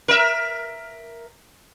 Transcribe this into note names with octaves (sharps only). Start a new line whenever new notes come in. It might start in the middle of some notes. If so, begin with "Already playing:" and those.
A#4 E5